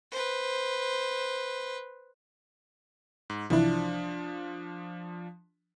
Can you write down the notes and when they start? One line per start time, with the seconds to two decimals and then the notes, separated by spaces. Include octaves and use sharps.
0.11 B4 C5
3.30 G#2
3.50 C2 E3 F3 D4 E4